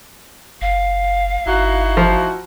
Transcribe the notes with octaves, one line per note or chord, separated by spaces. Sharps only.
F#1 F5
G1 D#4 E4 F#4
F3